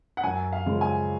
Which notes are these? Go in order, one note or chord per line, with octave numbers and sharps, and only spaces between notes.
F#5
F#2 G#5
F5
C#3 F3 G#3
G#5